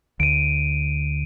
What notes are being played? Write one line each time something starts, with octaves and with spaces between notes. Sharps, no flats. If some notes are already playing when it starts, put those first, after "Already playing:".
D2 D7 D#7